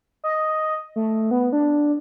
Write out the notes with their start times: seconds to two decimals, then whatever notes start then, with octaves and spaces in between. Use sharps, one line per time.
0.24 D#5
0.96 A3
1.31 B3
1.52 D4